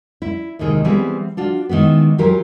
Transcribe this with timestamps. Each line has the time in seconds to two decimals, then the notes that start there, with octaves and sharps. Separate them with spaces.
0.22 E4
0.59 D#2 G#2 C3 D#3 G#4
0.85 E3 G3 B3 C4 E4 G#4
1.37 D4 F4 F#4
1.69 D#3 E3 G#3 B3
2.18 E3 F#3 F4 G4 A#4